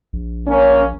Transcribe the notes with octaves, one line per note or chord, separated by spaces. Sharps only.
A#1
A#3 C#4